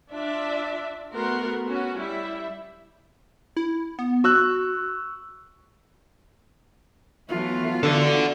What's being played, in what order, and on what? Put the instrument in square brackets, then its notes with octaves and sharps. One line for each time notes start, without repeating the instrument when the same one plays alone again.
[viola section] D4 F4 D5 E5
A3 B3 F#4 A#4 F#5 C6
B3 C#4 F#4
G3 E4 E5
[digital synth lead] E4
B3
[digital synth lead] F#4 [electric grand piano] C#6 E6 F#6
[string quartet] E3 F#3 A3 [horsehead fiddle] B3 F4
[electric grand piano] D3 [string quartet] E3 F#4 [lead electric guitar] A4 D5